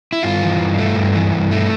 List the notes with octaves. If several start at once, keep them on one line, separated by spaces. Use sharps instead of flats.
E4
G2 F4
E3
G2
A3
G2
E3
G2
A3